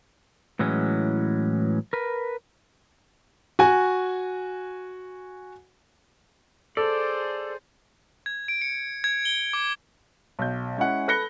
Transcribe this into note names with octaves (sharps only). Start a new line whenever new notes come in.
A2 E3 F#3 G#3 C#4
A#4 B4
F#4 G#5
G#4 A4 C5 D5
G#6
D7
C#7
G#6
G7
D6
B1 G6
G#3 C#4 E4 F#5
A4 B4 F#6 A#6 C#7 G7